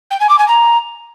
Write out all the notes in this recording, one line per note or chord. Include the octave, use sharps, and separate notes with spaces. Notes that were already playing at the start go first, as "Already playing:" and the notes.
G5
G#5
D6
G#5
A#5